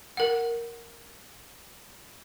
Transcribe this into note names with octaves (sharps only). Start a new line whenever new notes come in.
A#4 F#5